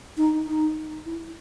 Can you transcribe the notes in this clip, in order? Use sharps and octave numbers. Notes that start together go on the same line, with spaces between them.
D#4
D#4
E4